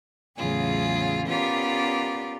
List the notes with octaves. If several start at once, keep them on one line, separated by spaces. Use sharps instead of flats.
E2 A2 C#3 F#3 F4 G#4
B3 C#4 F4 G4 A#4 D5